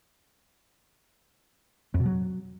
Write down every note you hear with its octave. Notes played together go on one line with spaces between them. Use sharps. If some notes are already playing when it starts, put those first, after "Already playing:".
F2
B2
F#3